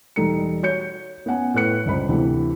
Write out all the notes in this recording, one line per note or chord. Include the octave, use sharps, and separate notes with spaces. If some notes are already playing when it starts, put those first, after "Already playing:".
E1 G3 D#4 A4 C#7
F#4 C#5 G6 C#7
B3 C#4 F#5 G#5
A2 B4 F#6 C#7
G1 C#2 C5 B5
D2 C3 E3